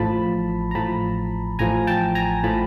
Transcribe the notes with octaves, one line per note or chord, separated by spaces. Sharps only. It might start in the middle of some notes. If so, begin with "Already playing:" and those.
Already playing: A1 A2 F3 A5 B5
A#5
A1 A2 F3 A5 B5
A1 A2 F3 G#5 A#5
G5 A5
G#5 A#5
A2 F3 A5 B5